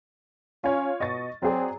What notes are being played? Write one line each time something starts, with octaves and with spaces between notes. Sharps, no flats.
C#4 F4 C#5
B2 D#5 C#6 A6
F#3 C4 G#4 D5